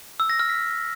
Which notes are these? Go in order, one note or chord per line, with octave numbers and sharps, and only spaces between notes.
E6
A#6
F6
B6